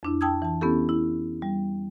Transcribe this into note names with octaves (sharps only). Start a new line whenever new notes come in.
F2 D4 E4
G5 A5 D#6 E6 G#6
E3 A5
B3 C#4 E4 G4 A4
E4
G3